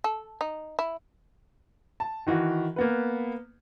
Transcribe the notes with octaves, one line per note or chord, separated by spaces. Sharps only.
A4
D#4
E4
A5
D#3 E3 F#4
A#3 B3 B4